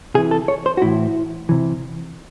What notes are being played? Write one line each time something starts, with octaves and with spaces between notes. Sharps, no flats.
C3 E3 G#4
A4
C#5
C5
F#4
A2 E3 E4
C3 E3